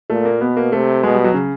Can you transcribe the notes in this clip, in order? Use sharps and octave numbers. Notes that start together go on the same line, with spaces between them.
A#2 A3
A#3
B2 B3
A#3
C3 A3
B2 G#3
G3
F#3
C#3